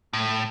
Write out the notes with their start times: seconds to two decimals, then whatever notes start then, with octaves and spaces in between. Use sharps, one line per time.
0.13 A2